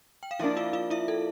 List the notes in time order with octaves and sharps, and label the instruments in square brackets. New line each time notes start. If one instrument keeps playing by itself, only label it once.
[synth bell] G5
F5
[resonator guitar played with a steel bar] F3 A#3 D4 [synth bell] E4 E5
[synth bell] F4 F5
F4 F5
E4 E5
A4